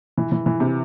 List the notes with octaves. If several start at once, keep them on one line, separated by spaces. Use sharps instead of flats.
E3
E3
E3
C3